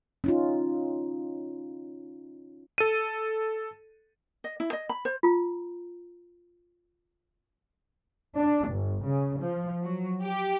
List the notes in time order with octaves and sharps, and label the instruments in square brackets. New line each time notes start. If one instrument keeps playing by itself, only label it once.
[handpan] C#4 D#4 F4
[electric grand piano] A4 D#7
[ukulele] D#5
E4
D#5
B5
C5
[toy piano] F4 A#5
[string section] D4
G1
C#3
F3
F#3
G4